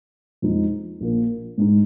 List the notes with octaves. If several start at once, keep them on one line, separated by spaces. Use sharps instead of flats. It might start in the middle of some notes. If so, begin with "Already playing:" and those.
F2 F3 G#3 D#4
A#1 A#2 A#3
G#2 G#3 D#4